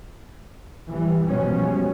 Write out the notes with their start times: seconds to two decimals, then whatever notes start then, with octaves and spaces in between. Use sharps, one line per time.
0.88 E3 G3
1.27 B2 F3 G3 G#3 C#4